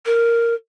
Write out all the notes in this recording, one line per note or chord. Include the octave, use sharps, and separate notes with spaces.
A#4